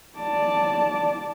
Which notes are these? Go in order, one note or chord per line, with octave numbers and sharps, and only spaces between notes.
D5 A5